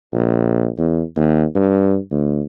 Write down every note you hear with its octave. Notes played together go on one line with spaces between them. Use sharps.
A#1
E2
D#2
G2
D2